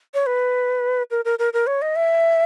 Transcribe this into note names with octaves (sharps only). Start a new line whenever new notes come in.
C#5
B4
A#4
A#4
A#4
A#4
C#5
D#5
E5